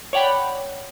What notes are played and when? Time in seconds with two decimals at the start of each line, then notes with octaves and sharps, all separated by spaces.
0.13 C#5 D5 F#5 G5 B5